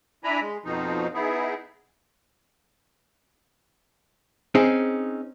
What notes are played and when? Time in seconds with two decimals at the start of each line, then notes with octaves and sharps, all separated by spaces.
0.24 D4 E4 G#5 A#5 B5
0.41 G#3
0.65 F2 B2 F3 D#4
1.14 B3 D#4 E4 G#4
4.55 C4 C#4 D#4 G#4